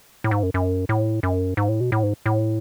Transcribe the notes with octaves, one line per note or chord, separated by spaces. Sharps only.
A2
G#2
F#2
F#2
A2
F#2
G#2
A2
B2
A2
G#2
A2